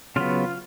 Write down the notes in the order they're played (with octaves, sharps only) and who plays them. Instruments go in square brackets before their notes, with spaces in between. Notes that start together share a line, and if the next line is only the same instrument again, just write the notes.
[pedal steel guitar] C#3 F#3 B3 F4